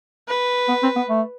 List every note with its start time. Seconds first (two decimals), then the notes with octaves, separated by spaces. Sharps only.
0.28 B4
0.69 B3
0.83 C4
0.96 B3
1.09 A3